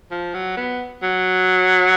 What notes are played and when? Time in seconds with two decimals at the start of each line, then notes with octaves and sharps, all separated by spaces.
0.11 F3
0.34 F#3
0.57 B3
1.03 F#3